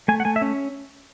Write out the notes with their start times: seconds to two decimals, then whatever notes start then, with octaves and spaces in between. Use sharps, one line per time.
0.08 A3 G#5
0.20 F#5
0.25 A3 G#5
0.36 E5
0.42 C#4